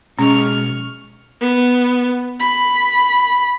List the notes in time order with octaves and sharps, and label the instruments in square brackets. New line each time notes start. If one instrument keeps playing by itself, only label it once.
[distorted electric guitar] B1 [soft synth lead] G#3 [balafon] C#4 [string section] C#6 F6
[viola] B3
B5